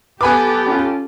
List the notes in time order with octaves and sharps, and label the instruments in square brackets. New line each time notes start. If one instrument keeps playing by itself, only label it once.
[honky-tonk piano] B3 B5 D6 [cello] G4 A4 [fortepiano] B4 G#5
[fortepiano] C#4 F4